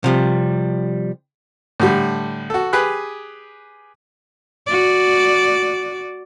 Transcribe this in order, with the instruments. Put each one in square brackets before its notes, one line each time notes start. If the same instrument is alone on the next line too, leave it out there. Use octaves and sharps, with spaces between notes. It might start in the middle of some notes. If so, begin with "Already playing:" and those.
[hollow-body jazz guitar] C3 F3 G3
[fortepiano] A2 D3 G3
F#4 A4
G4 G#4 B4 F#6
[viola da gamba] F#4 D5